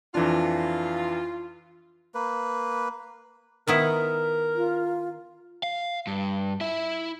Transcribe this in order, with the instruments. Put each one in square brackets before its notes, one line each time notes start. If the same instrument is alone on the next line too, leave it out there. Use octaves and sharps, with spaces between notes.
[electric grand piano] F2 E3 D4 [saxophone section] F4
[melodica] A#3 B4
[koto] D#3 B3 E4 [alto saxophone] A#4
[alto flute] F4
[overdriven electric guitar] F5
G2
E4 E5